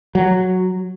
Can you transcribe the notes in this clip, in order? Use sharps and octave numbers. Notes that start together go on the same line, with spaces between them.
F#3